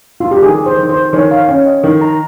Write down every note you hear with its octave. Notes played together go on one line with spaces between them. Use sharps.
F4
G4
D#3 G#4
C5
D#3
C5
D#3 C#5
F5
C#4 G5
D#5
D#3 G5
A#5